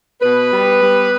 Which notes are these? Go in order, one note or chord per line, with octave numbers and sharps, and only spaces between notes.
B2 B3 B4
G3
G3